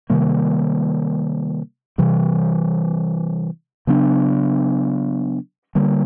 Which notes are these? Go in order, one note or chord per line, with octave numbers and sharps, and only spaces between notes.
C3 D#3 G3 A#3
C3 E3 G3
C#3 F#3 B3 D4
D3 G3 A#3